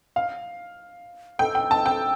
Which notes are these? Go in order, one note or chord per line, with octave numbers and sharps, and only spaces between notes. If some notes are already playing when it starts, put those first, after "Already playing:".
F5
A4 G5
G5
A5
G5